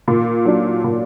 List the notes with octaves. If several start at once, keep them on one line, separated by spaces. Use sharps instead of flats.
A#2
F#3 D4
A#2